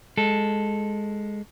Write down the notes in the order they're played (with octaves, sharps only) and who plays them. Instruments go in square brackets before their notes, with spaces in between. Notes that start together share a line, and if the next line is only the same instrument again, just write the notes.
[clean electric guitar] G#3 A4